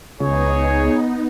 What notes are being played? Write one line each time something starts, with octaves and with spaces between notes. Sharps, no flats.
C#2 B3 D#4 G#4 C#5